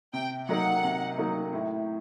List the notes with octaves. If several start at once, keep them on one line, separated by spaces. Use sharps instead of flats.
C3 G5
F#3 A#3 D#4 F#5
C3
F#3 A#3 D#4
A2